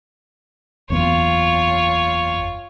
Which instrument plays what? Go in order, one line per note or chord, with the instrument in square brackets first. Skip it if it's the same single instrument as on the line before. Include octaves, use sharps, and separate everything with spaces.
[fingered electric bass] F#1 E2 B3 [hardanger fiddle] F4 C#5